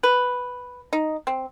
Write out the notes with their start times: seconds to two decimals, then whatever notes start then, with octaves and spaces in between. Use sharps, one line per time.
0.03 B4
0.93 D#4
1.27 C4